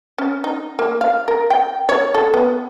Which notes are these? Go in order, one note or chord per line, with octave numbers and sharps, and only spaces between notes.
C#4
D#4
A#3
F5
A#4
G5
C#5
A4
B3